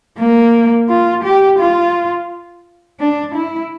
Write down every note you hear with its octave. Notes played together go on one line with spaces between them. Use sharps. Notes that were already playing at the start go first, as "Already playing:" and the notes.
A#3
F4
G4
F4
D4
E4